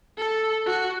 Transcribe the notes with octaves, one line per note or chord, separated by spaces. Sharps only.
A4
F#4